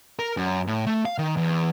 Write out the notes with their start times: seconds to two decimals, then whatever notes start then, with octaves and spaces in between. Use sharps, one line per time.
0.19 A#4
0.37 F#2
0.67 A2
0.86 A3
1.05 F5
1.18 D#3
1.37 E2